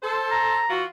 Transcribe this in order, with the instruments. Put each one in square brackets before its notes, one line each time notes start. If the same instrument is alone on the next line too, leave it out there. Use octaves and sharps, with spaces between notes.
[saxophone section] A4 C5
[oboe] A#5
[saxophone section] E3 F4 F#4